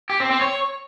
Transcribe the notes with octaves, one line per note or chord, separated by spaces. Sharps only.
G4
C4
C4
C#5